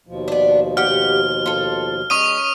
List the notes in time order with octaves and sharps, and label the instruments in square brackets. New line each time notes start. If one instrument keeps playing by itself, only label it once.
[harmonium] D#2 B2 F3
[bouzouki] B3 D4
[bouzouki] G4 F#5 [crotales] F6
[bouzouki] F4 A4
[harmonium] G#3 [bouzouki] C#4 [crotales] C#6 D#6 D#7